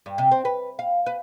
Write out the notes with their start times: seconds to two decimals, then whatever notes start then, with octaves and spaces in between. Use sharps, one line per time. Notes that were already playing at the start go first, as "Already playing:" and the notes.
0.06 G2
0.18 C3
0.31 C4
0.45 B4
0.79 F5
1.06 B4